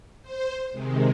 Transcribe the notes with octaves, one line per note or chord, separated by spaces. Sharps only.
C5
C3 D#3 G#3